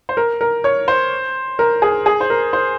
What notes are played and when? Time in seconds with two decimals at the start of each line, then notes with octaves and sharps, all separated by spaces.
0.09 C5
0.17 A#4
0.41 A#4
0.64 C#5
0.88 C5
1.59 A#4
1.82 G#4
2.06 G#4
2.21 C5
2.30 A#4
2.53 C5